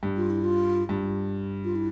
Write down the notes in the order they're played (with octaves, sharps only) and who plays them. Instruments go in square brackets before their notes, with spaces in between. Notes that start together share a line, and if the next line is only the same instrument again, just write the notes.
[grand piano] G2
[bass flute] F4
E4
F4
[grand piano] G2
[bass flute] F4
E4